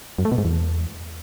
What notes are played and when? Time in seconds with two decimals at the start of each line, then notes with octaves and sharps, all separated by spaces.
0.18 F#2
0.25 A3
0.32 B2
0.38 G#2
0.45 E2